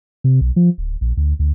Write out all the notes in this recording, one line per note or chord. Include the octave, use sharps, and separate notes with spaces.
C3
B1
F3
D1
A#1
D2
D2